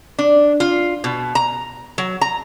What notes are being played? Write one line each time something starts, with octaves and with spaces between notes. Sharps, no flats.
D4
F4
B2
A#5
F#3
A#5